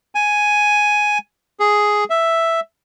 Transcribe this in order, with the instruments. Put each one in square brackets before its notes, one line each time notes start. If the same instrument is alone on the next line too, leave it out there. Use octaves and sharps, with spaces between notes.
[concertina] G#5
G#4
E5